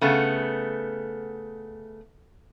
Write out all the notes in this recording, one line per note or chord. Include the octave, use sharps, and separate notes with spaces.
C#3 A3 B3